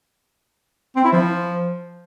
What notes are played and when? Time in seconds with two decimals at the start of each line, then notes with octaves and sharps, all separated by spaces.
0.96 C4
1.04 E4
1.13 F3